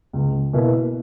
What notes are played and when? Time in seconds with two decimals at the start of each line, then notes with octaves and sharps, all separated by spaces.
0.13 C#2
0.53 B2 A#3 E4 B4